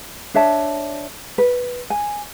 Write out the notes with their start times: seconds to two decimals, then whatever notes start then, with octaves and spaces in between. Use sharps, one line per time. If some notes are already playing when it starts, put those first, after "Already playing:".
0.34 D4 C#5 E5 A5
1.38 B4
1.90 G#5